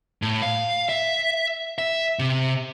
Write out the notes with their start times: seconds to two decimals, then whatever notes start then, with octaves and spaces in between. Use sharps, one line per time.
0.22 A2
0.42 F5
0.89 E5
1.78 E5
2.19 C3